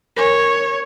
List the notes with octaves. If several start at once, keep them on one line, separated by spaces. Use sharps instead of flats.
A#4 C#5 G#5